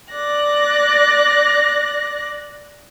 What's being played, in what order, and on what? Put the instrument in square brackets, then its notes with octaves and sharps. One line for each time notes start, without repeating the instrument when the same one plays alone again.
[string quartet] D5 F#6 A#6